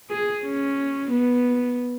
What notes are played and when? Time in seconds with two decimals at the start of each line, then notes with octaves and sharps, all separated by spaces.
0.10 G#4
0.44 C#4
1.11 B3